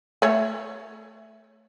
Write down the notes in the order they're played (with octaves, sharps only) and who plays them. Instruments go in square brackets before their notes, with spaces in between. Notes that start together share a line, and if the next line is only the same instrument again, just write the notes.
[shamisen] A3 C#5